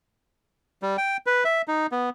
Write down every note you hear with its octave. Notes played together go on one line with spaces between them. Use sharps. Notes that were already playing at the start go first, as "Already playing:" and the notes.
G3
G5
B4
E5
D#4
B3